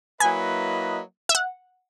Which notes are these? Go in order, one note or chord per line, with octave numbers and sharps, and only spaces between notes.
F#3 A#3 E4 B4 D#5 G#5
E5
F#5